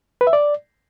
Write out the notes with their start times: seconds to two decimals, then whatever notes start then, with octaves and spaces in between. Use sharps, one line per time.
0.21 B4
0.27 E5
0.33 D5